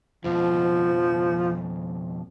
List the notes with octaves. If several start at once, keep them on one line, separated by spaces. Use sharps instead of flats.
F2 B2 F3